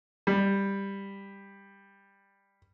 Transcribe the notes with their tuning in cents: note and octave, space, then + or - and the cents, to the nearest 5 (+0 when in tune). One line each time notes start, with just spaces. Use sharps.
G3 +10